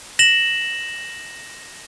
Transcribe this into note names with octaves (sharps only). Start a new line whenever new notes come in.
A#6 E7 F#7